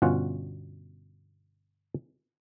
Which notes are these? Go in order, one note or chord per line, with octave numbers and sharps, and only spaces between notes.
G1 B2 C#4 F4 F#5